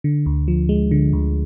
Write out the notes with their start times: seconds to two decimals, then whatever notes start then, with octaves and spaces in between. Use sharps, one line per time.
0.04 D3
0.26 D2
0.48 F3
0.69 G#3
0.91 D3
1.13 D2